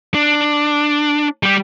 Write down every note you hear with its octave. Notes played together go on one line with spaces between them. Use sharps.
D4
G3 G4